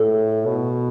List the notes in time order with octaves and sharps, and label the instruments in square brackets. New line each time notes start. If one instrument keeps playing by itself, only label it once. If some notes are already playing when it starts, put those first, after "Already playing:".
Already playing: [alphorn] A2 [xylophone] A4
[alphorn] B2